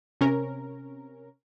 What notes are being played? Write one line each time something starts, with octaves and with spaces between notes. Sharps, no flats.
C3 C#4 A#4